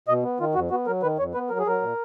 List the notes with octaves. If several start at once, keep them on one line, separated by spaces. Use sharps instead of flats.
B2 D#5
B3
D#3 F4
F2 F#4
B3 F#4
F#3 A#4
D#3 B4
F2 C#5
B3 B4
F#3 A#4
G#4
F#3 A#4
A#2